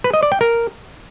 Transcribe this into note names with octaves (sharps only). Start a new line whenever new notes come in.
B4
D#5
D5
G5
A#4